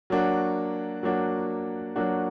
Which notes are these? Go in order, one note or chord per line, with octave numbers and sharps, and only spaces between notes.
F#3 A#3 D4 F#4
F#3 A#3 D4 F#4
F#3 A#3 D4 F#4